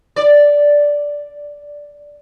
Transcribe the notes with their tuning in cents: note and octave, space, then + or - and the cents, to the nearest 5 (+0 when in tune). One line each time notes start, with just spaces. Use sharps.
D5 -5